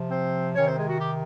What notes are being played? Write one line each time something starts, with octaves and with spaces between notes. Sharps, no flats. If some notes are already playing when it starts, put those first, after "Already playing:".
Already playing: C3 F3
C4 C5
C3 D#3 C#4 C#5
C4 C5
G#3 G#4
F#4
G4